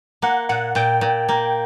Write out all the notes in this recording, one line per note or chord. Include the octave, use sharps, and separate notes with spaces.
A#3 F#5
A#2 F#5
A#2 G5
A#2
A#3